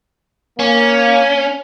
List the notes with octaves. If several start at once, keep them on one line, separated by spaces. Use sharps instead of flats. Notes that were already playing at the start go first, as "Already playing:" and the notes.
A#3 C#4